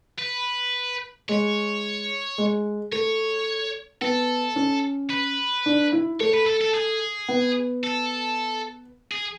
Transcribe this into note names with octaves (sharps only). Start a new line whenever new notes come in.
B4
G#3 C#5
G#3
A3 C#5
B3 A4
C#4
B4
D4
E4
A3 C#5
B4
A4
A4
G#4
B3
A4
G#4